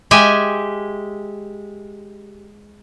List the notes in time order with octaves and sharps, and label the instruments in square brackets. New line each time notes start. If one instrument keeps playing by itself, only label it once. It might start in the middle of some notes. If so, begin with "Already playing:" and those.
[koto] G#3 G4 E5 G#5